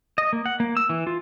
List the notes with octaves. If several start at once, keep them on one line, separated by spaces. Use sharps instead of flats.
D#5
A#3
F#5
A#3
E6
E3
F4